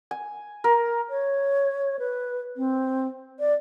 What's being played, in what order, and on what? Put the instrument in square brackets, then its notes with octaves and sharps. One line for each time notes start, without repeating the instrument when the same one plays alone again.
[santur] G#5
A#4
[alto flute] C#5
B4
C4
D5